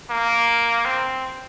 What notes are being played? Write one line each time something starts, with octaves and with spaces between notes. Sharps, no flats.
A#3
C4